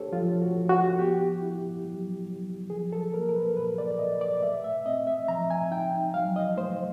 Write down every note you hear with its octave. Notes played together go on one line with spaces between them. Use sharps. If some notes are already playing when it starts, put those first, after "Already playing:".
Already playing: A3 D4 G4 A4 C5 C#5
F3 F4
F#4
F3
F#4
B3 G4
E4
F#3
F#3
F3 G#4
A4
A#3 A#4
A#4
B4
A#2 B4
D5
D5
A#2 D#5
D5
A3 E5
E5
C4 D#5
E5
F3 A#5
G#5
D#4 G5
F#3 F5
D#5
A3 C5